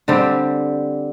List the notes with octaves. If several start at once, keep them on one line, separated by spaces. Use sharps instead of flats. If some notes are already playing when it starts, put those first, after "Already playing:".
D3 G3 C4 G4